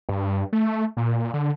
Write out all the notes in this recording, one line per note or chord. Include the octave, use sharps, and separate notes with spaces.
G2
A3
A#2
D3